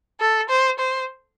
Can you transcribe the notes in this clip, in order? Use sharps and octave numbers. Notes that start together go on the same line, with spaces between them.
A4
C5
C5